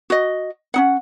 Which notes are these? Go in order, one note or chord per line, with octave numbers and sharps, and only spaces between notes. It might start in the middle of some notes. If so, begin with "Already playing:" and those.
F#4 D#5
C#4 D#4 F#5